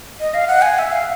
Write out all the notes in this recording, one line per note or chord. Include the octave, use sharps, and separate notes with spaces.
D#5
F5
F#5
G#5
E5
F5